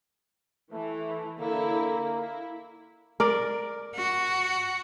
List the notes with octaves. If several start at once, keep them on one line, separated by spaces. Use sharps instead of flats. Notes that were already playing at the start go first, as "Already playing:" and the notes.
E3 A3
D3 A#3 E4 A4
E4
A#4 D5
F#4